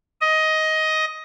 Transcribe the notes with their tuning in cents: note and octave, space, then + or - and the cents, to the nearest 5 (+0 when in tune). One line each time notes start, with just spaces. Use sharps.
D#5 +15